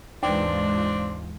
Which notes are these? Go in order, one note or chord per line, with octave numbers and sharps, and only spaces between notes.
D#2 G#2 E3 G#3 C4 D4 F4 B4